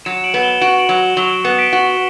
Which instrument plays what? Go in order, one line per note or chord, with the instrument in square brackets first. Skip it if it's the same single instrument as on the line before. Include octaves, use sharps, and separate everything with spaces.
[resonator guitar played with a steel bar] F#3 [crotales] C#7 E7
[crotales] D7 F#7
[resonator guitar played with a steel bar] B3
[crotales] E7 G7
[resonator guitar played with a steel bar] F#4 [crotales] D7 F#7
[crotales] D7 F#7
[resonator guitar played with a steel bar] F#3
[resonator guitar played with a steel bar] F#3 [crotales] E7 G7
[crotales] D7 F#7
[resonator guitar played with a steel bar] B3 [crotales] C#7 E7
[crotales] B6 D7
[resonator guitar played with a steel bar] F#4